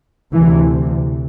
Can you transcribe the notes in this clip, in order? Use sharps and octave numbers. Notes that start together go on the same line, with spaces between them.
D2 C3 E3